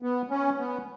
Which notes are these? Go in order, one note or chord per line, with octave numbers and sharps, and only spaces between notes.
B3
C#4
B3